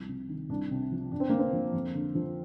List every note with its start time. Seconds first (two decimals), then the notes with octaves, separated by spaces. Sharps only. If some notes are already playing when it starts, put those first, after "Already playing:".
Already playing: C2 F3
0.08 C3
0.29 D#3
0.49 C2 D4
0.71 C3
0.91 F3
1.12 F2 D4
1.20 C4
1.30 D3 A#3
1.39 C4
1.53 F3
1.73 F2
1.94 D3
2.15 F3